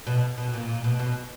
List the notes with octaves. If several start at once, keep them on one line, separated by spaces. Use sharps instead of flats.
B2
B2
A#2
A#2
B2
B2